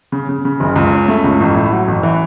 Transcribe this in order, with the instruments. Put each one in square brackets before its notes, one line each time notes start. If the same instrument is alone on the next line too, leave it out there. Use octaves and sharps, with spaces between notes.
[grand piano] C#3
C#3
C#3
F#1
C#2
C#4
A3
C#2
A1
A2
F#3
A1
E3